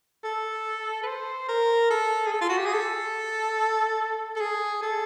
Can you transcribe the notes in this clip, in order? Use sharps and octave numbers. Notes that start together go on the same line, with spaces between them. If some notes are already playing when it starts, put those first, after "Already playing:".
A4
B4
C5
A#4
A4
G#4
A4
F4
F#4
G4
G#4
A4
A4
G#4
A4